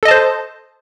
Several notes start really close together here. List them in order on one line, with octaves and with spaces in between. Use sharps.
A4 D#5 A5 C5